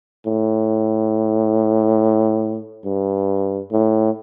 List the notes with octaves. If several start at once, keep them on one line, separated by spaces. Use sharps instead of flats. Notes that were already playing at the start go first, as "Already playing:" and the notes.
A2
G2
A2